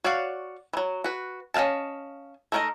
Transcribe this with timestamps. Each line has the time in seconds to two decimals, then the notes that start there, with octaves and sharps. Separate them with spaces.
0.04 F#4 C#5 D5 F5 F#5
0.73 E3 F#3
1.04 F#4 B4
1.54 C#4 D#5 F5 G5 A5
2.52 A3 D#4 A#4 C#5 D#5